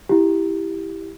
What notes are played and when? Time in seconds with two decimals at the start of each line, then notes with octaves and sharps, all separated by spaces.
0.09 E4 G4